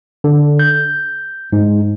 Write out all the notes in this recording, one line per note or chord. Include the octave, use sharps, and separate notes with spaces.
D3
G6
G#2